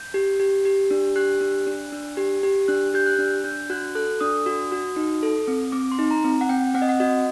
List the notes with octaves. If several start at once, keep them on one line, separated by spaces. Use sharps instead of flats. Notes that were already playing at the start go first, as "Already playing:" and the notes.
Already playing: G6
G4
G4
G4
D4
G4 F#6
D4
D4
D4
G4
G4
D4 F#6
G4 G6
F#6
D4
D4 G6
F#4 F#6
A4 F#6
D4 D#6
F#4
F#4
D#4
A4
C4
C4 D6
C6
D#4
A#5
C4
F#5
C4 G5
C4 F#5
D#5
F#5
F#4 D#5